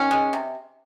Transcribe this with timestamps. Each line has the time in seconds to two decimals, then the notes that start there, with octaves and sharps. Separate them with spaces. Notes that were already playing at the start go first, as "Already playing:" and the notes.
Already playing: D#3 C#4
0.11 G#3
0.33 C3